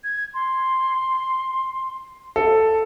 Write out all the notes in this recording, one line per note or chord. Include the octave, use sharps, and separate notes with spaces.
G#6
C6
A4